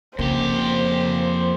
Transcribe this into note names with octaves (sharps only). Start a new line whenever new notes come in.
F2 C#3 A#3 G4 C5